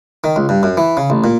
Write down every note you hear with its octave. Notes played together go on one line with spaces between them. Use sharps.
D#3
C#2
G2
F#2
E3
C#3
A1
A#2